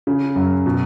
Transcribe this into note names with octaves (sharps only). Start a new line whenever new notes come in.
C#3
F#2
B2